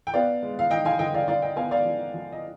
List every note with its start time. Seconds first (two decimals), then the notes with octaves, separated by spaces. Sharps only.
0.07 G5
0.14 B3 D5 F5
0.43 G#3
0.59 F5
0.71 D#4 D#5 G5
0.85 F5 G#5
0.99 D3 D#5 G5
1.14 D5 F5
1.28 D4 D5 F5
1.42 D#5 G5
1.56 B3 F5 G#5
1.71 D5 F5
1.85 F3
2.14 F3
2.32 D#5